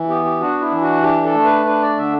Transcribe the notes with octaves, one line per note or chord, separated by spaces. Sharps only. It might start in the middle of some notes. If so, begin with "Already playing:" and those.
Already playing: E3
B3 G4
G4
D4 F#4
E4
E3
F#4
D4 G4
A4
A3
B4
D4 B4
D5
D3 E5